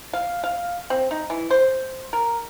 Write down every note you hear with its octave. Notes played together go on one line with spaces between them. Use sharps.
F5
F5
C4
D#4
E3
C5
A#4